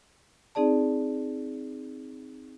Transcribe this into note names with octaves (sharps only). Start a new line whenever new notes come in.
C4 D#4 G#4 D5 A5